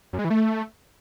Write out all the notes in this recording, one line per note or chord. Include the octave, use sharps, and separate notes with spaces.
F#2
G#3
E3
A3